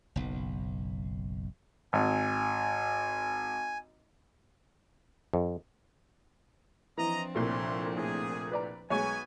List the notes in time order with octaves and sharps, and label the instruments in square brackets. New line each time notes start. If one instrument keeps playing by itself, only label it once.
[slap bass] F#1 B1
[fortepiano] G#1 [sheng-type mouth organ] G#5
[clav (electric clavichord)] F2
[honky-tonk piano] E3 [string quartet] F3 C4 D4 [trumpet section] D#5 A#5
[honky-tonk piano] C2 A#2 A3 [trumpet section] C#5 E5 C6
[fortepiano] A2 [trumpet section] G#4
[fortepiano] B4 D5 A#5
[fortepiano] B1 G#3 [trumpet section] B3 G#5 [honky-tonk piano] C#5 C#6